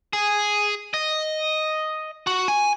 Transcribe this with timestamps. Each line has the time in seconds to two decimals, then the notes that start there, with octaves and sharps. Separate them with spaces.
0.13 G#4
0.94 D#5
2.27 F#4
2.48 G#5